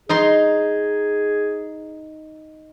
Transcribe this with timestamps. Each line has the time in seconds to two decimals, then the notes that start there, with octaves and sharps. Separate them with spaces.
0.09 D#4 G#4 A#5 C6